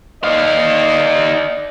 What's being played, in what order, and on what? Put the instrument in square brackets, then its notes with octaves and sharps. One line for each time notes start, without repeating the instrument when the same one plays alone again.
[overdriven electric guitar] D#4 F5 [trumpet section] D5 D#5